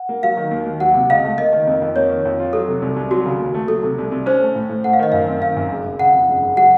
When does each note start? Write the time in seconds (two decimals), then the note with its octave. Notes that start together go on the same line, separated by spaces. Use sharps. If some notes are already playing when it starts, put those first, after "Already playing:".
Already playing: F#5
0.09 A#3
0.23 F#3 F5
0.37 D#3
0.51 D#2
0.66 D#2
0.80 F#3 F#5
0.94 C3
1.10 C#2 F5
1.24 A3
1.38 A#3 D#5
1.53 D#3
1.67 F2
1.82 F2
1.96 A#3 C#5
2.10 D#3
2.25 F2
2.40 F4
2.53 F#3 A4
2.68 C3
2.82 C2
2.96 C2
3.11 F#3 F#4
3.25 C#3
3.39 D#2
3.54 A3
3.68 F#3 A4
3.83 C3
3.98 C2
4.12 C2
4.26 C#4 C5
4.41 A3
4.55 A2
4.69 A2
4.84 A3 F#5
4.93 F5
4.99 D#3 D#5
5.12 F#2 F5
5.28 C4
5.42 D#3 F5
5.57 F#2
5.71 F#1
5.85 F#1
6.00 C#3 F#5
6.14 F2
6.29 F#1
6.42 F#1
6.57 F#3 F#5